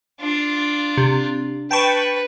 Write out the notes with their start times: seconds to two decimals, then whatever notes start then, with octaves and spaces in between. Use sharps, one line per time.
0.21 D4 F4
0.97 C3
1.71 B4 G5 A5 C#6